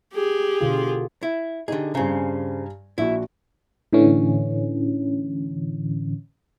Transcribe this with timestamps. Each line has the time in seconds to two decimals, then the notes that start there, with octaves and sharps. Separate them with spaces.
0.13 G4 G#4
0.61 B2 D3 F4
1.23 E4
1.68 D3 D#4 G4 G#4
1.95 G2 C#3 C4 G#5 A#5
2.98 A#1 E4 F#4
3.93 A2 D3 E3 C#4